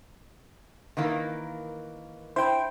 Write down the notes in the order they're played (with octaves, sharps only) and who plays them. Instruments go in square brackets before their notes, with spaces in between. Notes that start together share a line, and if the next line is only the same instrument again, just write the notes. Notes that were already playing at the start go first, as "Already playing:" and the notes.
[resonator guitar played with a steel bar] D#3 E3 A#3
[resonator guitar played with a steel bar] E4 [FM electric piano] C5 G5